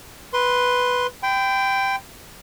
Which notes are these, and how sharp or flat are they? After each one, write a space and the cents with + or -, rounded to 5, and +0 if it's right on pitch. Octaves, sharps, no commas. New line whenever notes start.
B4 +0 C6 +0
G5 +0 B5 +45